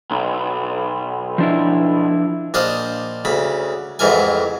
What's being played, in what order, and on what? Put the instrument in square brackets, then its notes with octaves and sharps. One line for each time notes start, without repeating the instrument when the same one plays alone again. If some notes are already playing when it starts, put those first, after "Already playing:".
[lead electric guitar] B1
[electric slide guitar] F3 D4 E4
[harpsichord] A#1 D4 C5 D#5 F5
D2 C#3 B5
A1 F2 G#2 E3 A#4 G#5